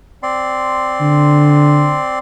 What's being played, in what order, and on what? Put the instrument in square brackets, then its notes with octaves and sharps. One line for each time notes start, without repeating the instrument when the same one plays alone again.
[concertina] C4 D5 C6
[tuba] D3